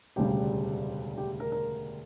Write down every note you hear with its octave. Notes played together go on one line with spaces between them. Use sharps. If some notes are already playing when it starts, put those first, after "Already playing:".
E1 D2 C#3 G3 G4
G4
A#4
A#4